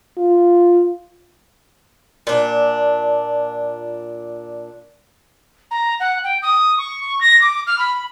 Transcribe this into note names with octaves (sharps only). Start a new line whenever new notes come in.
F4
A#2 D4
A#5
F#5
G5
D#6
C#6
A#6
D6
F6
B5